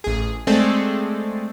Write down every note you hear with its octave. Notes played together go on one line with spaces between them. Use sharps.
A1 G#4
G#3 A3 C4 G#4 A4 D5